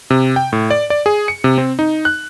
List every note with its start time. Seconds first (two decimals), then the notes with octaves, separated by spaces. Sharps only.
0.10 C3
0.36 G5
0.53 A2
0.71 D5
0.90 D5
1.06 G#4
1.28 C#7
1.44 C3
1.58 C4
1.79 D#4
2.05 F#6